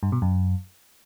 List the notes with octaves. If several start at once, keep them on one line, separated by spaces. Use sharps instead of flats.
G2
B2
F#2